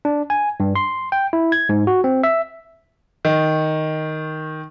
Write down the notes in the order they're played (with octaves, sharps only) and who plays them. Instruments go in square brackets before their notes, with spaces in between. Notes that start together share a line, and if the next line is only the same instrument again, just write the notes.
[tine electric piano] D4
G#5
G2
C6
G5
E4
G#6
G#2
F#4
C4
E5
[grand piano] D#3